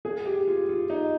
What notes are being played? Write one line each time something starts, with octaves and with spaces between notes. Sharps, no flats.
G#4
G4
F4
F4
D#4